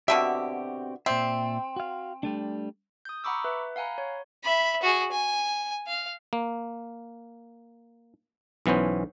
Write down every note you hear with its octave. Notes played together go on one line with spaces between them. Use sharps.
B2 D3 C4 F#4 G4 E5
A#2 C4 D5 E5
F#4 F5
G3 A3 D4
D#6 G6
F#5 A#5 B5 C#6 D6 E6
B4 E5
F5 F#5 G#5 A#5 B5
C#5
E5 B5
F#4 G#4
G#5
F5
A#3
B1 E3 B3 C#4 C5